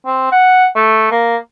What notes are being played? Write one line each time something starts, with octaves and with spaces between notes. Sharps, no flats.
C4
F#5
A3
A#3